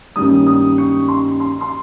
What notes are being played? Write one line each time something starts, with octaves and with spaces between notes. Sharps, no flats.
G2 D#3 G3 A#3 C#4 D#6
D#6
C#6
C6
C6
C6